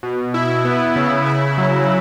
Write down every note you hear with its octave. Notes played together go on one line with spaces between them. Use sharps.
B2
E4
B3
C#3
E4
F#3